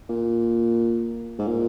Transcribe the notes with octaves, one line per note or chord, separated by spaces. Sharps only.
A#2
G#2
A#2